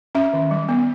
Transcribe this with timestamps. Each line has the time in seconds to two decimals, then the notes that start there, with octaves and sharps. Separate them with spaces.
0.15 C#4 E5
0.33 D#3
0.51 G3
0.69 B3